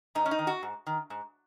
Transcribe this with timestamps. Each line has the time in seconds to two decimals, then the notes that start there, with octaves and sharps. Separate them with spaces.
0.15 G#2 D#4
0.26 C#4
0.31 D#4
0.39 D#3
0.47 F#4
0.63 G#2
0.87 D#3
1.10 G#2